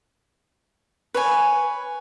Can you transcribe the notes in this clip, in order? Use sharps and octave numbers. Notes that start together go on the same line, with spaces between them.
B4 C#5 G#5